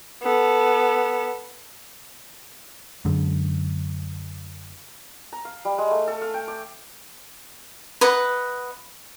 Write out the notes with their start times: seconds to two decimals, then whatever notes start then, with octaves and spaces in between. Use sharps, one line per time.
0.23 B3 A4
3.05 F#2 D3 G#3
5.33 A#5
5.45 F5
5.65 G3
5.78 G#3
5.91 A3
6.08 A4
6.22 F5
6.34 G5
6.48 D5
8.01 B4 D#5 F#5